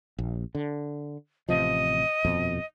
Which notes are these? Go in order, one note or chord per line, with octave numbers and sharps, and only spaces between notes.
A#1
D3
A1 C3 F3 D#5
D#1 F2 B2